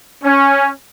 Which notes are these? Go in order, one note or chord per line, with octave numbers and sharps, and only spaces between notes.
C#4